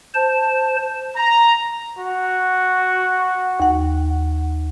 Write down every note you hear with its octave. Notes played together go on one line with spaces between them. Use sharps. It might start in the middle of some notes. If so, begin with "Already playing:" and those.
C5 A5
A#5
F#4
D#2 F#5